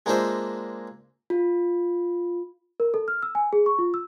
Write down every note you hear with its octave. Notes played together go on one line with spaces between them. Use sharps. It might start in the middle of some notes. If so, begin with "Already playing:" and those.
G#3 A#3 D4 F4 C5 E5
F4
A#4
A4
F6
E6
G#5
G#4
C#6
F4
E6